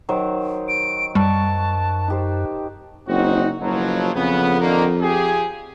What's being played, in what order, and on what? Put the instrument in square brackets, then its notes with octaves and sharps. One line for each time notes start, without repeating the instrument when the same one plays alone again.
[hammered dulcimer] D#3 F#3 C5
[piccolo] D7
[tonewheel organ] F#2 [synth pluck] G3 [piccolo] A5 [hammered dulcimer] C#6
[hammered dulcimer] D#4 G4 C5
[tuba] F#1 [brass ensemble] C4 D#4 F#4
[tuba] F#1 [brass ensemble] B2 F3 F#3
[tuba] F2 [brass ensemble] C#3 B3
[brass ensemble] D3 D#3 A#3
F3 G4 G#4